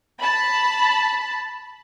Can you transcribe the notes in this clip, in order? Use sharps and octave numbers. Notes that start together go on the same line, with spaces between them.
A5 B5